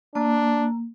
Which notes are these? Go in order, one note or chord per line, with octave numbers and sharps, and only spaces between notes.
A#3 D4